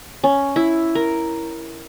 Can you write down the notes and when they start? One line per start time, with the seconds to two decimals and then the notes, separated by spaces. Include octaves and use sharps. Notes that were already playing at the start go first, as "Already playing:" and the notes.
0.24 C#4
0.56 E4
0.95 A#4